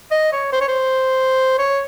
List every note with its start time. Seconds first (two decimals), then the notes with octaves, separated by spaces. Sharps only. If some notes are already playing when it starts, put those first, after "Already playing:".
0.11 D#5
0.33 C#5
0.53 C5
0.61 C#5
0.68 C5
1.59 C#5